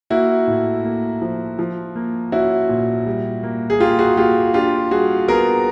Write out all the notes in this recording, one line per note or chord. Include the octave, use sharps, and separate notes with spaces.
A#3 E4 F#4
A2
A#3
F3
F3
A#3
C#4 E4 F#4
A#2
G3
A#3
G#4
A#3 F4 G4
F#4 G#4
A#3 F4 G4
D4 F4 G4
G3 F#4 G#4
B3 G#4 A#4